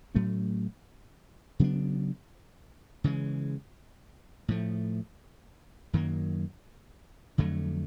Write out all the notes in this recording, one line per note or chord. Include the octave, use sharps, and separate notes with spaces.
A2 F#3 A3 C#4
C#3 F#3 B3 D4
C#3 E3 G#3
A2 F3 A3
F#2 D#3 F#3 A#3
F2 D3 F#3 A3